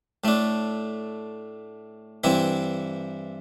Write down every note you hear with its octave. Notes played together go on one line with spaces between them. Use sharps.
A2 A3 D4
G2 E3 C4 E4